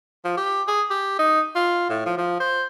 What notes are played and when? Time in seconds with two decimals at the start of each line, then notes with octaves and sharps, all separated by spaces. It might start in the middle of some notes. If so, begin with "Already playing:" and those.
0.25 F3
0.37 G4
0.68 G#4
0.90 G4
1.19 D#4
1.55 F4
1.89 A2
2.06 F3
2.18 F3
2.40 C5